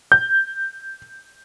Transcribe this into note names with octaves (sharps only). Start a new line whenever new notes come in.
G6